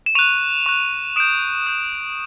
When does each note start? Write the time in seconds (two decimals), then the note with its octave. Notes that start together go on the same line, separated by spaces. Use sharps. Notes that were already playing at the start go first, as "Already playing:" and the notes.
0.06 E7
0.15 C#6 F#6 D#7 F7
0.66 C#6 F#6
1.16 D#6 G6 D7 E7
1.67 D#6 G6